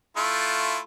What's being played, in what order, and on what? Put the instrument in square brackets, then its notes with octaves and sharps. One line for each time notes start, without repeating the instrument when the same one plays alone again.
[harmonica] A3 E4 F4